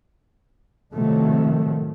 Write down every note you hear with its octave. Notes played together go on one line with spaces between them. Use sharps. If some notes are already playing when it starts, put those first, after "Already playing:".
A2 C3 D#3 F3 F#3 A3